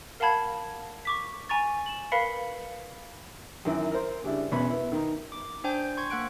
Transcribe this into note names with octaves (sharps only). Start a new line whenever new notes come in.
A#4 F5 F#5 A5 B5 G#6
C#6 D6 B6
G#5 A#5 C#6 A6
E7 F#7
A#4 B4 F5 B5 B6 C#7
F#2 D#3 E3
A#4 C5
C#3 G3 D4 E4
B1 E2 B2 B3 C#4 B5
B3 E4
D#3 D#4
D6
D4 C5 G5 G#5 G6
C6 C#6 G#6
A#3 F#5 F#6 D7